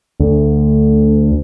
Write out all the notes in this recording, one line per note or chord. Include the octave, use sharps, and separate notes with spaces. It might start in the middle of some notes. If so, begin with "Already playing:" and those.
D2